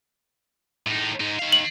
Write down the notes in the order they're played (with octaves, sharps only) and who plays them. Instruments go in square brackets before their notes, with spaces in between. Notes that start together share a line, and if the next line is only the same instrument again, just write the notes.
[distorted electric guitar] A2 D#4
G#2 D#4
D#3 F5
[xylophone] F#7